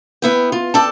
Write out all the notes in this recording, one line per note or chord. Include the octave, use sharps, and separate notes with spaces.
B3 E4 G5
F4
A4 D5 G5 A5